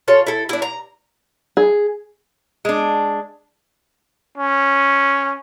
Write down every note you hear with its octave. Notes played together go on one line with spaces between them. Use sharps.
F4 A4 C#5
E4 A4
D4 E4
A#5
G#4
G#3 D4
C#4